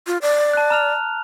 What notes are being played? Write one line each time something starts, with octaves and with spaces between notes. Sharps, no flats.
F4
D5
A5 F#6
A#5 F6 F7